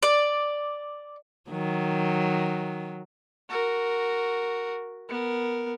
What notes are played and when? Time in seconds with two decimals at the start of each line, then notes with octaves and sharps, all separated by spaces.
0.03 D5
1.50 D#3 F#3
3.49 F#4 A#4
5.09 B3 A#4